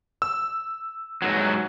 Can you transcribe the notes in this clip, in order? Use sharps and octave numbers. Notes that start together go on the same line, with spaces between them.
E6
G#2 F#3